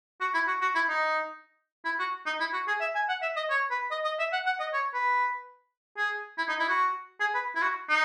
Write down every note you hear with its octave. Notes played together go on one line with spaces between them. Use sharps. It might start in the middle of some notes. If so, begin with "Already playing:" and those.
F#4
E4
F#4
F#4
E4
D#4
E4
F#4
D#4
E4
F#4
G#4
E5
G#5
F#5
E5
D#5
C#5
B4
D#5
D#5
E5
F#5
F#5
D#5
C#5
B4
G#4
E4
D#4
E4
F#4
G#4
B4
E4
F#4
D#4